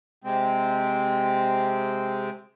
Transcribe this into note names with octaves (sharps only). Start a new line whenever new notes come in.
C3 G#3 C4